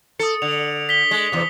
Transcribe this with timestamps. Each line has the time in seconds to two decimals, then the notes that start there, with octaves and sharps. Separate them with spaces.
0.19 A4 D#6 C#7
0.42 D3 F7
0.89 B6 G7
1.11 G#3
1.32 E2 C3